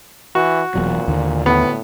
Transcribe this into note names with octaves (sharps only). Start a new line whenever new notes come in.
E3 F#4
E1 E2 A#2 F#3
D#2 D3
A2 B3